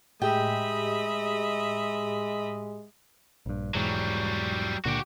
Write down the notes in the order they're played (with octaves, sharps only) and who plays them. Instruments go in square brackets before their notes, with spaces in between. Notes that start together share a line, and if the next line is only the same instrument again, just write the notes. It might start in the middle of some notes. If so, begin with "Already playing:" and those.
[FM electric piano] A2 G4 G#4 [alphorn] G#3 [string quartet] D#5 E5 B5 [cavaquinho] G5
[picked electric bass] A#1 G2
[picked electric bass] E1 G#2 E3 [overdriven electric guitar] F#3 G3
[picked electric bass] C#2 A#2 D3 [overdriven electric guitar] F#4 G4